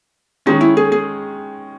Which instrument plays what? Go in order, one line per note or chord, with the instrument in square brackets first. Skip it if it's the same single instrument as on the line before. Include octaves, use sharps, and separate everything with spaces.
[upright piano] D#3 G#3 C#4 [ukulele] D#4
[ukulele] E4
G#4
G#4